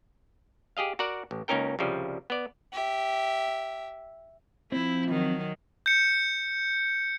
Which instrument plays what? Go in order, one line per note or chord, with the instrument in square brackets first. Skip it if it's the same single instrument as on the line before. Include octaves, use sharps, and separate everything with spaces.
[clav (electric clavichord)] G4 G#4 D#5 F5
F#4 A#4 D5 F#5
A1
C#2 A#3 C#4 D#4 A#4 G5
C2 C#3 F3 G3
B3 D5
[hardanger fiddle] G4 E5
[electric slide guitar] F3 C4 [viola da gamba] E4
[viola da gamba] D#3 F#3
[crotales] G6 C#7